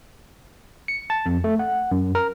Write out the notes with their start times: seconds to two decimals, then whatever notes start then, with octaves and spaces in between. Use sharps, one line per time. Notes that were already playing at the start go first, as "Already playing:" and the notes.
0.88 C#7
1.10 A5
1.26 F2
1.44 A3
1.59 F#5
1.92 F#2
2.15 A#4